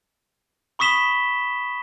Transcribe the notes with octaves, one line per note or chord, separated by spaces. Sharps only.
B5 C#6 D#6 B6 E7 G7